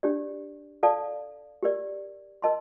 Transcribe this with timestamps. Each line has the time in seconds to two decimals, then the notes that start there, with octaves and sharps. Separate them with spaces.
0.03 D4 G4 D5
0.83 A4 D5 F5 A5
1.63 G4 A#4 D5
2.42 A#4 D#5 A5 C6